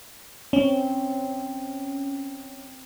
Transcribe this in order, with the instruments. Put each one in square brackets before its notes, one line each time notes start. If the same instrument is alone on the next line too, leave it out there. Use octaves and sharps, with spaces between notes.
[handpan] C4 [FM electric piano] C#4